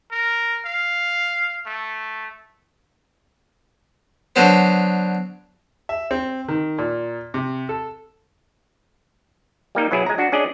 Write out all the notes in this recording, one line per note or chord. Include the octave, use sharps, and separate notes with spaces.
A#4
F5
A3
D3 F#3 B3 C5
E5
C4
D#3
A#2
C3
A4
G3 A#3 D#4
B2 F#3 E4 G#4
G#3 A#5
D4 F#4
C#4 D4 G#4 D5 D#5